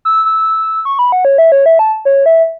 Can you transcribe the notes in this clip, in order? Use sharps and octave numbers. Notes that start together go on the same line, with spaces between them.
E6
E6
C#6
B5
F#5
C#5
E5
C#5
E5
A5
C#5
E5